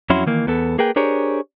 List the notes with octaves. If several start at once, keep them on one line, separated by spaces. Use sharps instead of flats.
F2 F#3 C#4 E4 F#4 C6
D#3 E3 A#3
E2 B3 A4
A#3 G#4 A#4 B4 G5
D4 G4 G#4 A#4 C5 C#5